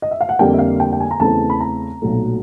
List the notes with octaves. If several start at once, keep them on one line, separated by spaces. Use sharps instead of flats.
D#5
E5
F5
F#5
F2 D3 G3 A#3 G5
E5
F5
G5
G5
G#5
A#5
E2 C#3 E3 A3 C4 A5
B5
A#5
B1 A#2 F#3 A3